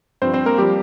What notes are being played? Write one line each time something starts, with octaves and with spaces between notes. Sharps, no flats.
G2 F3 C4 C5
C4 C5
A#3 A#4
F3 G3 G4